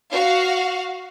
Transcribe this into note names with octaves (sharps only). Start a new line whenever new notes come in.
F#4 F5